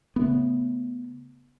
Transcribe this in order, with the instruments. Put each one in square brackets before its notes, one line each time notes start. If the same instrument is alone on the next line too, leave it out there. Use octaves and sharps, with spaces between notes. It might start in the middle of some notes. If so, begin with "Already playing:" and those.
[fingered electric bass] C#3 A3 B3